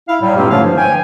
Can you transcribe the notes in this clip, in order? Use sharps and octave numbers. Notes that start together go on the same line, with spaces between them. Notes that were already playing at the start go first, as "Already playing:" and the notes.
E4 F5
A2 F#3 G3
G2 A#2 G#3 A#3 C4 G4
D3 F3 A3 C#4 C#5 F5
G2 F3
G5 G#5